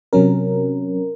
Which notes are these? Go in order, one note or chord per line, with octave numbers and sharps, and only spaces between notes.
C3 F#3 C#4 A#4